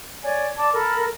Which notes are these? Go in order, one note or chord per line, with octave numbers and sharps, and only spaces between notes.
C#5 D5 G#5
D5 A5 D6
A4 A#4 B5